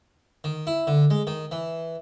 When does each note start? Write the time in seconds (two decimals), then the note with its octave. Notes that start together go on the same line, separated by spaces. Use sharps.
0.44 D#3
0.67 E4
0.87 D3
1.10 G#3
1.27 D#3
1.52 E3